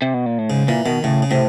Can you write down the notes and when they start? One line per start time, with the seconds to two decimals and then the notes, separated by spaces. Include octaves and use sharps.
0.02 C3
0.14 B2
0.26 A#2
0.38 A2
0.50 G#2 C#3
0.68 A#2 E3
0.86 B2 D#3
1.04 A2 C#3
1.22 C#3
1.31 A2 C3